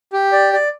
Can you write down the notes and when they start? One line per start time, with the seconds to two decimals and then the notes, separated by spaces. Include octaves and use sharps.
0.13 G4
0.33 D5
0.53 D5